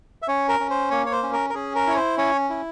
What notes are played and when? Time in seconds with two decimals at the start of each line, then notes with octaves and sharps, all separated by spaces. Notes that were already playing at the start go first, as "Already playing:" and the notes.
0.22 E5
0.28 C#4 C#5
0.48 A#4
0.60 C#4
0.70 C5
0.91 A#3 C#5
1.06 C#5
1.12 C5
1.23 C#4
1.33 A#4
1.50 A#4
1.54 C#4 G#4
1.75 A#4
1.87 E4 C#5
1.96 C5
2.18 C#4 C#5
2.50 E4